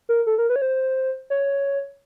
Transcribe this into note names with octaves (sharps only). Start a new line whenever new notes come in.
A#4
A4
A#4
B4
C#5
C5
C#5